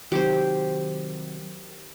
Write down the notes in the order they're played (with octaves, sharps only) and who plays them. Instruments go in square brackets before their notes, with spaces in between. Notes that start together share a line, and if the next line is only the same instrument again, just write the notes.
[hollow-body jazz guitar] C3 F#3 [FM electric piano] D#3 [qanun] G4 C5